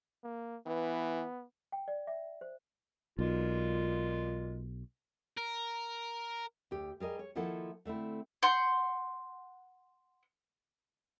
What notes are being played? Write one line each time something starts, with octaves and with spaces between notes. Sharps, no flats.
A#3
E3 B3
G5
D5
E5
C5
B1 A#2 G#3 F4
A#4
D2 G4
G3 G#4 A#4 D#5
C#5
D#3 F3 A#3 E4 A4 F#5
D3 A3 C4 E4
F#5 C6 G6